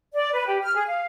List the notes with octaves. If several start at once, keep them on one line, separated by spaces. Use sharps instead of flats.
D5
B4
G4
F6
G#4
F5